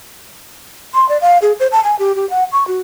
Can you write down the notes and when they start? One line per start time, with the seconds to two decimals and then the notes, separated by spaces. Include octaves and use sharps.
0.94 C6
1.09 D5
1.21 F5
1.42 G#4
1.60 C5
1.72 A5
1.84 G#5
1.99 G4
2.15 G4
2.30 F#5
2.52 C#6
2.67 F#4